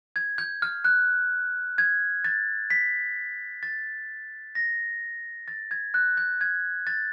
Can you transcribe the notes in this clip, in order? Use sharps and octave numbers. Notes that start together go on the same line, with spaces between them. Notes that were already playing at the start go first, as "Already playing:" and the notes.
G#6
G6
F6
F#6
G#6
A6
B6
A6
A#6
A6
G#6
F#6
G6
G#6
A6